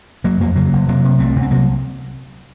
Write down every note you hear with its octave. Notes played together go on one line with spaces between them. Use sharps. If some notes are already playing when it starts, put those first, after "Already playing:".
F1 F#3 A#3
F2 F#3 A#3
C#3 F#3 A#3
F1
C3 F#3 A#3
C3
C2 A3 C4
C2
C4
C3 F#3 A#3